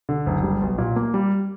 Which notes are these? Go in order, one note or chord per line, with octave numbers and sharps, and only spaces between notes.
D3
F#1
G3
B1
A#2
A#3
G3